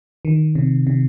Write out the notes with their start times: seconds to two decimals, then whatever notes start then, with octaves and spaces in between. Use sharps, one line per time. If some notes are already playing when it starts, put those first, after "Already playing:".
0.25 D#3
0.55 C3
0.87 C3